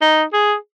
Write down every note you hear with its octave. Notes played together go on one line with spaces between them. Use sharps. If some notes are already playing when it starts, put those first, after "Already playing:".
D#4
G#4